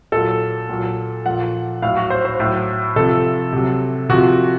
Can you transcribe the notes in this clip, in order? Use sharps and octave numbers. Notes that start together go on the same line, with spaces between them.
A#2 F#3 A4
A#2 F#3
A#2 F3 F#5
A2 F#3 F5
F#4
C5
C5
A2 F#3
C3 F3 A4
C3 F#3
C3 F3 F#4